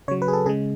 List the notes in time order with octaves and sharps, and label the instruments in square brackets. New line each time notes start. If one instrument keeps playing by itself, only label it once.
[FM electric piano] C#3 C#5
F#3
B4
G#4
A4
C#3 G#3 G#4